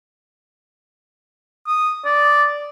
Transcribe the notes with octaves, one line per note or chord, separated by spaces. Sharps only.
D#6
D5